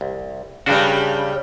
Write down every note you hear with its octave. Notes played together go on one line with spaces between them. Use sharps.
C2
G2 C#3 G3 D4 F#4